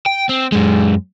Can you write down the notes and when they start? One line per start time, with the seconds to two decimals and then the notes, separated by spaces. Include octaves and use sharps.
0.06 G5
0.29 C4
0.52 F#2 G#3